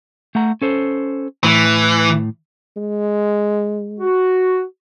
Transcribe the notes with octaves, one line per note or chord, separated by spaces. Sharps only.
A3 F#5 A#5
C#4 A4 C5
A2 E3
G#3
F#4